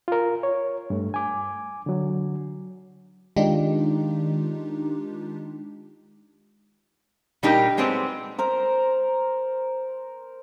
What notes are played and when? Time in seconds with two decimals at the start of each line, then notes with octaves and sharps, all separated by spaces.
0.08 F4 A#4
0.43 C#5
0.90 G2 A3
1.14 G#5 D6
1.86 D3 F#3
3.36 D#3 G#3 D4 D#4 F4 G4
7.43 A#2 G3 A#3 D4 D#4 G4
7.77 F#3 G#3 B3 C4 D5
8.39 A#4 C5